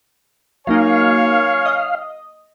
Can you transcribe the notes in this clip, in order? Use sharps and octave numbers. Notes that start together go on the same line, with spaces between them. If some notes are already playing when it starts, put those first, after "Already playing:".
F#3 A#3 D#4 C#5 F5 G#5
D#5